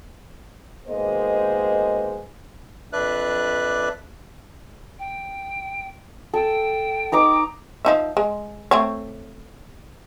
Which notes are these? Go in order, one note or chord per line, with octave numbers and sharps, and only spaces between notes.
B2 D#3 G#3 A#3 C5 D#5
F2 D4 B4 D5 E5 F#6
G5
A4 G5
D#4 A#5 D6
F3 D#4 E5
G#3
A3 C4 C#5